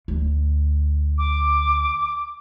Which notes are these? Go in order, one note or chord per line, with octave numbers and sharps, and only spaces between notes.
D2
D6